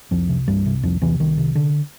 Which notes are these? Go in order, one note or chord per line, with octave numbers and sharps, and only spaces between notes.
C2 F2 F3
C3
C2 G2 G3
C3
C2 F2 F3
E2 C3 E3
C2 D#3
C3
D3